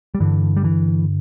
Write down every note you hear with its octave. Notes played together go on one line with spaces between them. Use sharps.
G3
G2 D3 E3
G3
E3